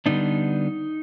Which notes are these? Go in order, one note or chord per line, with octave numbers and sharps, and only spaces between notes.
D3 G3 B3 D4 D#4